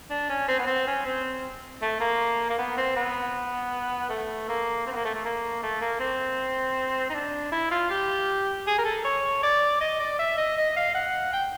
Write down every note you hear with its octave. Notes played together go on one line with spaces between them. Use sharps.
D4
C#4
C4
B3
C4
C#4
C4
A3
A#3
A#3
B3
C4
B3
A3
A#3
C4
B3
A#3
A3
A3
A#3
A3
A#3
C4
D#4
D4
E4
F4
G4
G#4
A#4
A4
C#5
D5
D#5
D5
E5
D#5
D#5
F5
F#5
G5